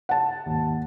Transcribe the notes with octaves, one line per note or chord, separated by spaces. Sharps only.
F#5 A5
G#1 D#2